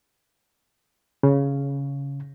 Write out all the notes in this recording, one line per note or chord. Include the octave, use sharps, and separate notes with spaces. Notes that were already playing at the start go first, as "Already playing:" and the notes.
C#3